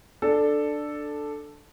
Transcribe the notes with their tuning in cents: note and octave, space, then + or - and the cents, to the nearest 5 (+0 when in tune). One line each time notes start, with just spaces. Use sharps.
D4 +10 A4 +0